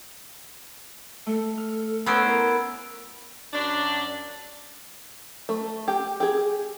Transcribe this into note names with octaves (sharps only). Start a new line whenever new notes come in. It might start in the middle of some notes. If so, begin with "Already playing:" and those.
A3 A4
F6
B3 C#4 C5 B5 E6 D7
E4 A#4
F#2 D4
A3
G4
G4 G#4